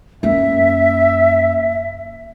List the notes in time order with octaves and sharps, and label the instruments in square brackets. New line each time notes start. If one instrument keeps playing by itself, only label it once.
[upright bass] F#2 A#3 [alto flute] E5